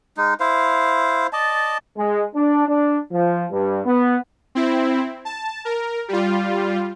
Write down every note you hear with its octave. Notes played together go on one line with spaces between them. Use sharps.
G#3 D#4
E4 C5 F5
D5 D#5 A5
G#3
D4
D4
F3
G2
B3
C4 E4
A5
A#4
G3 F4